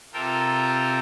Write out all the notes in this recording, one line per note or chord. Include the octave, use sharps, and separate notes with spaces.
C3 F4 A4 A#4 G5